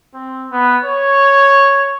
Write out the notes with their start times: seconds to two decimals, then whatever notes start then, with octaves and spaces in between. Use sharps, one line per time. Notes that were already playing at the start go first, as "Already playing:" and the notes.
0.14 C4
0.51 B3
0.85 C#5